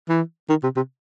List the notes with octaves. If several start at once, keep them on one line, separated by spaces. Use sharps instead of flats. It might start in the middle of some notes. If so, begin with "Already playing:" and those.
E3
D#3
C3
C3